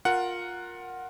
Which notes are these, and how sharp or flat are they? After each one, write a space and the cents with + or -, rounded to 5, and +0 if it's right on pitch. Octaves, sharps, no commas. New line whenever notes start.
F4 +20 A#4 +0 F#5 +0